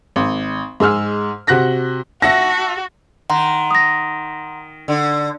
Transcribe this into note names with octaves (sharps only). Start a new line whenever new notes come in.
G#1
G#2 G#4 E6 F6
C3 F#4 F#6 A#6 B6
F#4 E5 F#5 A5 A#6
D#3 F#5 A#5 C6
D#6 A#6
D3